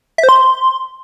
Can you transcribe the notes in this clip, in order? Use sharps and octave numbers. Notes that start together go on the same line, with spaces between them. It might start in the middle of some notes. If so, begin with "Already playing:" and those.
E5
C5
C6